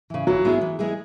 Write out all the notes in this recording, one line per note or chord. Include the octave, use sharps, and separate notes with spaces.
C#3 E3
E3 F#3
G#3 B3 E4 G#4
E3
G#3 B3 E4 G#4